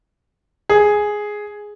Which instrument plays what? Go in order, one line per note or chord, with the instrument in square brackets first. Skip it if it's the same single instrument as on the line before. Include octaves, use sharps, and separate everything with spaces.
[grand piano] G#4